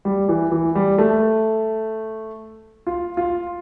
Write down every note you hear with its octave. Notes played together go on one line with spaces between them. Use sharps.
G3
E3
E3
G3
A3
F4
F4